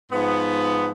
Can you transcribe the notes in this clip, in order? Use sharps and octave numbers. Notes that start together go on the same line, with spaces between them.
G#2 F3 B3